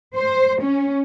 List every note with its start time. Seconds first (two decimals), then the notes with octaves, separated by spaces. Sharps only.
0.16 C5
0.62 C#4